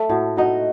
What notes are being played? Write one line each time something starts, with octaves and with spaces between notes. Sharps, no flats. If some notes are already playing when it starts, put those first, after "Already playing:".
Already playing: A3 A4
A2 F#4
D#4 F#4